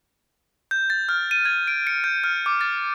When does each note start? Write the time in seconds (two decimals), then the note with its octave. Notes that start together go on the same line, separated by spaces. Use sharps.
0.71 G6
0.90 A6
1.09 F6
1.31 D#7
1.45 G#6
1.68 D7
1.87 C#7
2.04 G6
2.24 F6
2.46 D6
2.61 A6